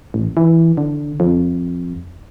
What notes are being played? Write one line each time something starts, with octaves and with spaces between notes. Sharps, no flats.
A1
E3
D3
F2